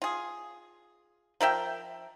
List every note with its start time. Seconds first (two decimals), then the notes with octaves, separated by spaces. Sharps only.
0.02 F4 G#4
1.40 F3 A#4 E5 G5